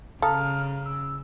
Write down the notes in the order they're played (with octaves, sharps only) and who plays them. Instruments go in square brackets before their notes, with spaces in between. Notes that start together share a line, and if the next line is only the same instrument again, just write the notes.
[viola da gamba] C#3 [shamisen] A4 [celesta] F5 A#5 D#6 [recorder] F6
[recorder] E6